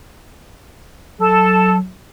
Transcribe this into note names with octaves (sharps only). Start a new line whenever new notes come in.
F#3 A4